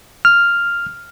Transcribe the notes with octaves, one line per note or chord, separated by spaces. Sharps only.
F6